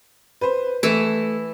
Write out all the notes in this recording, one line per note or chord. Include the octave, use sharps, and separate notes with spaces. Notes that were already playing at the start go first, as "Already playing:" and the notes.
B4 C5
E3 A3 E4